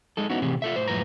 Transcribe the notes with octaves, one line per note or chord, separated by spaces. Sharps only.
G#3 D#4 A4
B3 C#4 D#4 E4 F#4
A2 C3 E3 C4 G4 G#4
F4 A4 E5
A2 C5
F#2 A2 C#3 F3 B4 A#5